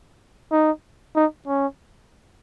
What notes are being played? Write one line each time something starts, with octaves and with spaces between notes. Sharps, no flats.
D#4
D#4
C#4